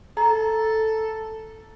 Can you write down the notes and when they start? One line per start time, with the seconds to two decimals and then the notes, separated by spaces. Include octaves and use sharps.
0.17 A4 A#5